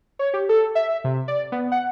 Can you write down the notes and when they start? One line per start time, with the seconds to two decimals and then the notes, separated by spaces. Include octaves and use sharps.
0.19 C#5
0.34 G4
0.49 A4
0.75 E5
1.04 C3
1.28 D5
1.52 B3
1.72 F#5